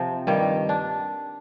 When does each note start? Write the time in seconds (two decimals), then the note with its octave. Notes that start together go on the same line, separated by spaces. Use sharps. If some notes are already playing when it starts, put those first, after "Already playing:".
Already playing: C3 F3 C4
0.27 G2 D#3 G3
0.69 D4